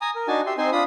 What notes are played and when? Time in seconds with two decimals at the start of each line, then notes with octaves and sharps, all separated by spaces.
0.01 G#5 A#5 D#6
0.15 A#4
0.28 D4 D#4 F#4 G#5 A5
0.46 G4 E5 C6
0.58 C4 D#4 C5 G#5 C6
0.72 D4 F4 B5 D#6